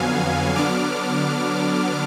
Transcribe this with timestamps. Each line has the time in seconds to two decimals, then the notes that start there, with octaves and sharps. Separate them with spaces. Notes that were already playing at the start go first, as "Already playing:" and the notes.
Already playing: F2 D3 F#3 B3 F5 G#5
0.56 D3 F#3 B3 D4 D6 F6